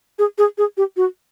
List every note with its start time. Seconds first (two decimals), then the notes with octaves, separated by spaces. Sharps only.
0.19 G#4
0.38 G#4
0.58 G#4
0.77 G4
0.97 F#4